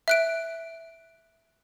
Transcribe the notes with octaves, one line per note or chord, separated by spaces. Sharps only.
E5 F#6 D7